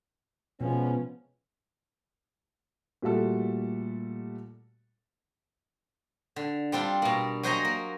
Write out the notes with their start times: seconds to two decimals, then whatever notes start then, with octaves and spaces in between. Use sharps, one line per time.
0.61 B2 F3 G#3 B3 C#4
3.02 A#2 G3 A3 F#4 A4
6.36 D3
6.72 G3 C4 D4 F4
7.02 B2 A#3
7.43 F#3 F#4 C5 D#5 G#5 A#5
7.65 A#3